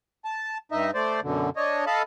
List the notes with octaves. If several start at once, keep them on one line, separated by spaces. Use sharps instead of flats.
A5
G2 D#4 D#5 E5
A3 C5 D5
F#2 B2 D3
D4 C#5 D#5
A4 D#5 F5 A5 B5